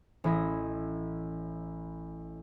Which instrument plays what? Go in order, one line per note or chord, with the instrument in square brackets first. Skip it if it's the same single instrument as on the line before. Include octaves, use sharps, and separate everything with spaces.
[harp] A1 E4 D#5